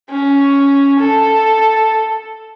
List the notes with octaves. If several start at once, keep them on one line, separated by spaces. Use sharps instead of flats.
C#4
A4